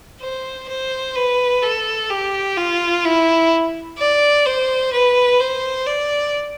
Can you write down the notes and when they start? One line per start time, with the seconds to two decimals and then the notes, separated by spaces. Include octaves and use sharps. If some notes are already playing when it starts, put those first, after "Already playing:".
0.21 C5
0.69 C5
1.16 B4
1.63 A4
2.10 G4
2.57 F4
3.05 E4
3.98 D5
4.46 C5
4.93 B4
5.40 C5
5.87 D5